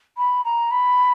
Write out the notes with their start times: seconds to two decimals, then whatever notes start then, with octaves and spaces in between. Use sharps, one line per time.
0.17 B5
0.45 A#5
0.71 B5